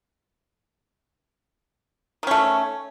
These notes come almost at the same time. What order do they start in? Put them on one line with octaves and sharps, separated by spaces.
D#3 C#4 A3